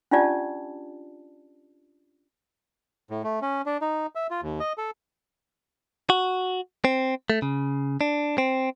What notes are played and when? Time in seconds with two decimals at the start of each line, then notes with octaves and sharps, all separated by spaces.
0.11 C#4 D4 F4 G4 D5 A5
3.10 A2
3.24 A3
3.42 C#4
3.66 D4
3.81 D#4
4.15 E5
4.31 F4
4.43 D#2
4.60 D#5
4.78 A4
6.10 F#4
6.85 C4
7.30 A3
7.42 C#3
8.01 D4
8.38 C4